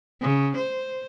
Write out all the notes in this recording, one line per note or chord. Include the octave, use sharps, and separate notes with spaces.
C#3
C5